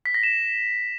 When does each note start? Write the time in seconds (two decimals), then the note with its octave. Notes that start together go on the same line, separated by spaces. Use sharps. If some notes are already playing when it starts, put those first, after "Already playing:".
0.06 B6
0.14 A#6
0.23 E7